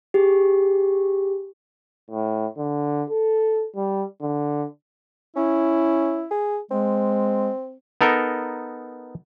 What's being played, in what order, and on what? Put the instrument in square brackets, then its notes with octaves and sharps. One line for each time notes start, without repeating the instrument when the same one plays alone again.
[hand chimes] G4 G#4
[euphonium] A2
D3
A4
G3
D3
[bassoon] C#4 [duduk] E4
[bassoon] G#4
[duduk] G#3 [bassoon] C4
[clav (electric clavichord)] B3 D#4 A4 A#4